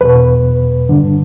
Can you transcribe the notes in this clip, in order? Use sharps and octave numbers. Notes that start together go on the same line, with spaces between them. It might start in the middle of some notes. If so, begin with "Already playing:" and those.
E2 B2 B4
G2 D3